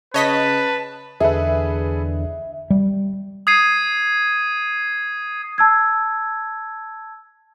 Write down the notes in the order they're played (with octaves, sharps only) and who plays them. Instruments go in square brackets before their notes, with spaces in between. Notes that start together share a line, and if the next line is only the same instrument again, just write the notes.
[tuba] C#3 [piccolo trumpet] B4 [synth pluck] C#5 D#5 B6 [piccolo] A5
[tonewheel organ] E2 D3 [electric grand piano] G#4 A4 B4 [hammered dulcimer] E5
[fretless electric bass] G3
[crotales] D#6 G#6 C7 D#7
[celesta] A5 E6 G#6